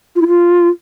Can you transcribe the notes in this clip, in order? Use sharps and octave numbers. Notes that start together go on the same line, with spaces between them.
F4
E4
F4